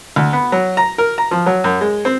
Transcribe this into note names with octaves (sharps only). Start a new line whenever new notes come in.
D2
B3
F#3
A#5
A#4
A#5
F3
F#3
F#2
G#3
C4